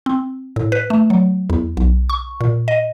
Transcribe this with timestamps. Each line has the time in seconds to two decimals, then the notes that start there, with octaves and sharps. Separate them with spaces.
0.06 C4
0.56 A2
0.72 B4
0.90 A3
1.10 F#3
1.50 E2
1.77 B1
2.10 C#6
2.41 A#2
2.68 D#5